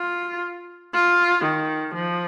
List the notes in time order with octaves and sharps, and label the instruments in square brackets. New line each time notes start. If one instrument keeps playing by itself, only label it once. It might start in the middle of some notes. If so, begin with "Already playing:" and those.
Already playing: [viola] F4
F4
D#3
F3